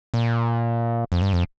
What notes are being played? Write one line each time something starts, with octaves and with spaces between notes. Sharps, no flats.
A#2
F2
G2
F2